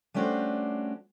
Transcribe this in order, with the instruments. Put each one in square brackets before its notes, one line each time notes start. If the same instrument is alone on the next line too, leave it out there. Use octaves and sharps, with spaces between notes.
[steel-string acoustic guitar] G3 A3 C#4 D4 F#4 C5